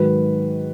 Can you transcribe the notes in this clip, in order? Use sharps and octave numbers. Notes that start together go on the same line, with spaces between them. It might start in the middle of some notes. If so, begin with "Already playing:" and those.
Already playing: G#2 D#3 F#3 B4